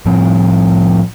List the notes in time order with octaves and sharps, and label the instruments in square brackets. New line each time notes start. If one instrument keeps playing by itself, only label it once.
[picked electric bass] A2 F3 C4